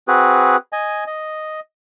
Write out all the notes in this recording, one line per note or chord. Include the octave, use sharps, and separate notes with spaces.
C4 F#4 G#4 B4
D#5 G#5
D#5